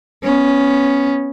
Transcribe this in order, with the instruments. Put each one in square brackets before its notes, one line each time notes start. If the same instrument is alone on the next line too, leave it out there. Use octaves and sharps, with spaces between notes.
[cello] B3 C#4